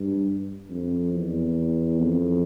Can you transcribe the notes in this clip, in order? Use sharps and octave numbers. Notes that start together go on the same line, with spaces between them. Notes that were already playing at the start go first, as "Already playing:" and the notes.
Already playing: G2
F2
E2
F2